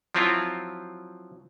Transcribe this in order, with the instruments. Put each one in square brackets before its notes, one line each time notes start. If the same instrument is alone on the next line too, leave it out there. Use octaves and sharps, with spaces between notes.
[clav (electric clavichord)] F3 F#3 C4 E4 F4